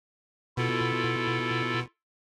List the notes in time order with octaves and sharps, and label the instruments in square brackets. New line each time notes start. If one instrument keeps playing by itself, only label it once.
[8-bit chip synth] B2 [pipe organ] E4 F4 A4